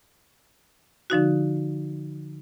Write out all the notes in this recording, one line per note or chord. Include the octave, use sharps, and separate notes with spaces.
D3 F3 D#4 F#4